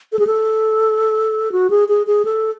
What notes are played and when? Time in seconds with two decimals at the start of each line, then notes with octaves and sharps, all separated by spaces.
0.12 A4
0.19 G#4
0.27 A4
1.52 F#4
1.70 G#4
1.88 G#4
2.07 G#4
2.25 A4